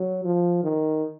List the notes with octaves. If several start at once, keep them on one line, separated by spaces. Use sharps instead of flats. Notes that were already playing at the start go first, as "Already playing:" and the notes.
Already playing: F#3
F3
D#3